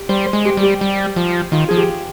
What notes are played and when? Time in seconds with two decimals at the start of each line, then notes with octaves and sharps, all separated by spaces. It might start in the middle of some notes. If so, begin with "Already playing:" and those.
Already playing: G4
0.09 G3 C5
0.26 C5
0.33 G#3
0.45 G4
0.57 G3
0.63 G4
0.81 G3
1.16 F3
1.52 D#3 F4
1.68 F3 G#4
1.77 G4